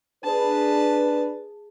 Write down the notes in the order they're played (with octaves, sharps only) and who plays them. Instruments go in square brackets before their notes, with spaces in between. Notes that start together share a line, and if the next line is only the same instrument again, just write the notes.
[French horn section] D4 B4 [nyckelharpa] G#4 A5